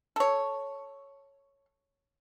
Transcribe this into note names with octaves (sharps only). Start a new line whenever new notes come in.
A4 C#5